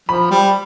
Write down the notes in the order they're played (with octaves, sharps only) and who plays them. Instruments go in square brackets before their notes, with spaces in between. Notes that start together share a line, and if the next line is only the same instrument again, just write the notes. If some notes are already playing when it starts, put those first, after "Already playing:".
[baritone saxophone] F3 [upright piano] B5
[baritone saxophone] G3